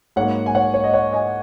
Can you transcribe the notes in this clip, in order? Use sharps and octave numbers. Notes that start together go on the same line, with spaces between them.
G#2 F#3 A#3 C#5 F#5
G#5
C#5 F#5
C#5
D#5
C#5 F#5
D#5 G#5